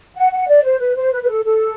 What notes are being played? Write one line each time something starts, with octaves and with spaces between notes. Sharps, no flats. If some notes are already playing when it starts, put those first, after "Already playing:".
F#5
F#5
D5
C5
B4
C5
B4
B4
A4
A4